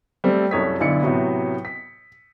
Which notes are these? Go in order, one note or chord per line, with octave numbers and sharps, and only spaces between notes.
G3 A3 C4
C2 F#2 A4 C#5 D#6 B6
B1 D3 E4 D5 C#7
A2 C3 F#3 B3
B6